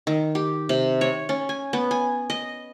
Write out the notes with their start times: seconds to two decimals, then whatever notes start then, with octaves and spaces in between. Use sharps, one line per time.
0.07 D#3
0.35 G4
0.69 C3
1.01 C#5
1.29 C#4
1.49 G#5
1.73 B3
1.91 G#5
2.30 D#5